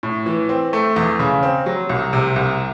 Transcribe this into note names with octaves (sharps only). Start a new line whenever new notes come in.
A2
E3
C4
A3
E2
C#3
C4
F#3
C2
C3
C2